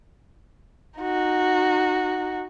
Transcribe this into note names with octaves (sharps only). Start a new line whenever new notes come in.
D#4 F#4